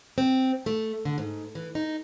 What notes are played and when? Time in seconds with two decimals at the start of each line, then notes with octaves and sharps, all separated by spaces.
0.18 C4
0.66 A3
1.05 D3
1.18 G#2
1.55 E3
1.75 D#4